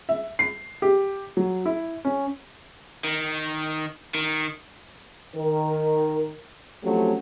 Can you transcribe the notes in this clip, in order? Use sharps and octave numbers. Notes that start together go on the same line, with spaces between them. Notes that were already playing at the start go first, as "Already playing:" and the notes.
E5
C7
G4
F#3
E4
C#4
D#3
D#3
D#3 A#4
F3 F#3 A3 C4 C#4 G4